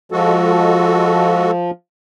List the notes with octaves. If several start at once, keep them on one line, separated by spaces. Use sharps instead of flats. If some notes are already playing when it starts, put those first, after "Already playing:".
F3 G#3 F#4 A4